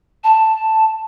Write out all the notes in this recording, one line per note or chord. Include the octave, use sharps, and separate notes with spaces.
A5